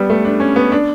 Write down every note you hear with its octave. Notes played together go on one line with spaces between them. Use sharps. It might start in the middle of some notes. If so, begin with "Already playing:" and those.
Already playing: G3 B3
A3
D4
C#4
B3
D4